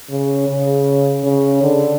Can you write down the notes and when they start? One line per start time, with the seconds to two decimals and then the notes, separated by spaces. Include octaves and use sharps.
0.10 C#3
0.49 C#3
1.24 C#3
1.63 D3